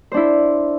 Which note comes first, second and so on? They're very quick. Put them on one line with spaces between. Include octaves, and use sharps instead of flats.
C5 D4 E4